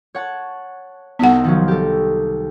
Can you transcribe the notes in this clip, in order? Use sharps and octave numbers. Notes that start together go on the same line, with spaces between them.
C#5 F#5 A5
C2 B3 D#4 E5 F#5
D#3 F3 F#3
G4 A4